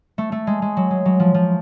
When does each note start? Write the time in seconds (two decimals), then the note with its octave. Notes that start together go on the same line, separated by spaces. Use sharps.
0.18 A3
0.32 A3
0.47 G#3
0.62 G#3
0.77 F#3
0.91 G#3
1.05 F#3
1.20 F3
1.34 F3